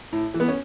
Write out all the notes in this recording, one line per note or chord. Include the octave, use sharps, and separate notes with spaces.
A2
E3
B3
C#4